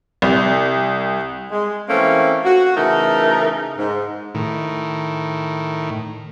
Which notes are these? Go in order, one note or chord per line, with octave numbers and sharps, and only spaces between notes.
C2
G#3
E3 A3 A#3 C4 C#4
F#4
C#3 E3 A3 D#4 A#4
G#2
A2 D#3